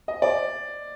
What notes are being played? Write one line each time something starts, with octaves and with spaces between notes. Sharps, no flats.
D#5
D5